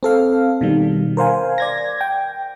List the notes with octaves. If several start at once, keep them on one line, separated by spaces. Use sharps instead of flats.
C4 A4 F5
B2 D#3 G3
A#4 C5 F5 G#5
D5 G#6 A#6
G5